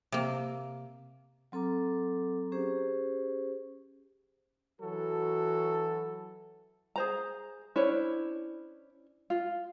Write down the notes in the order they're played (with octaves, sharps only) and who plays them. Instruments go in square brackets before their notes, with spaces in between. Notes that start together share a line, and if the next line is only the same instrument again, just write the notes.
[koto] C3 A#3
[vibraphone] F#3 C4 A4 A#5 D6
C#4 G4 G#4 C5
[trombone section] E3 F#3 F#4 A4
[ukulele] G#4 C5 A#5
[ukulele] C#4 D4 [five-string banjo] E4 C5 C#5
[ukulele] F4